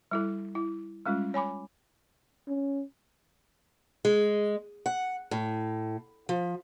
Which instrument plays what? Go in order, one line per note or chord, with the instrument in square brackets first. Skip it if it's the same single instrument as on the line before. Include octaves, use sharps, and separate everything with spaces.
[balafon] G3 E4 A4
E4
G3 G#3 C#4 F4
C#5 G#5 B5 D6
[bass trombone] C#4
[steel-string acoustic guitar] G#3
F#5
A2
F3